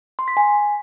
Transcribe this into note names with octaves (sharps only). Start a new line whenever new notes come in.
C6
B6
G#5